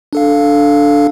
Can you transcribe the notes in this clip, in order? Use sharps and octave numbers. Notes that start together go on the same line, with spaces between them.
D4 A4 F5